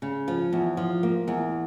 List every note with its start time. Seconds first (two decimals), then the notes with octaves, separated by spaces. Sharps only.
0.02 C#3
0.28 F3
0.53 E2
0.77 F3
1.03 A#3
1.28 E2